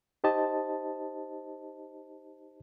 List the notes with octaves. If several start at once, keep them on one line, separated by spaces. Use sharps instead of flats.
D#4 G4 C5 D#5 A5